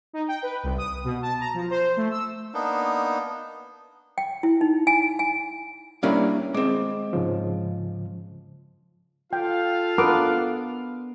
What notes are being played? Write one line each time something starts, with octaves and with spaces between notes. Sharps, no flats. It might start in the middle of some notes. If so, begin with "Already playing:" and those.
D#4
G5
B4
C2
D#6
B2
A5
A#5
F3
C5
A3
E6
A#3 B3 D4 D#4
G5
E4
D#4
G#5
G#5
G3 A#3 C#4 D4 E4 F5
G#3 C4 D6
G#2 C#3 F3
F4 A4 F5 G5
B3 D4 A#4 C6 D6